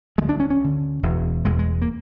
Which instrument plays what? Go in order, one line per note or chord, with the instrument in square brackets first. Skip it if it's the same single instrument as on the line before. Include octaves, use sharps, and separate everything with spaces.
[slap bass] D3 G#3
D2
D4
C#4
C#4
D2 D3
E1 E2 B2
E1 E2 B2 G#3
G#3
A#3